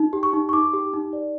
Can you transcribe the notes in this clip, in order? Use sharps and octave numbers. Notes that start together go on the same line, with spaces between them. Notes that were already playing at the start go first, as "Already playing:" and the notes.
Already playing: D#4
G4
C#6
D#4
C#6
D#4 D6
G4
D#4
D5